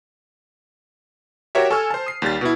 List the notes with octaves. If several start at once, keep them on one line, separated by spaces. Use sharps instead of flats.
F#4 G4 A#4 C#5 E5
A4 G#5 C#6 E6 F6
C5 A5
D#6 C7
D#2 G3 A6
B2 E4